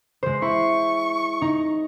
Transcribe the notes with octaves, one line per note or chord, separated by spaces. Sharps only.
G#3 C5
E4 C#6
D#4